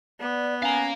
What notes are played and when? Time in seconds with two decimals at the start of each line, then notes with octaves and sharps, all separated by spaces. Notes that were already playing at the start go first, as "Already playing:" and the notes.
0.20 B3 D5
0.63 C#4 F5 G#5 A#5